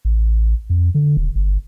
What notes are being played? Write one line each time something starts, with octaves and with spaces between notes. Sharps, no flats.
A1
F2
D3
D#1
G1